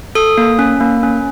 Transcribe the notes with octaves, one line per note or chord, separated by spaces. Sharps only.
A4 D#6
A#3
C#4
A#3
C#4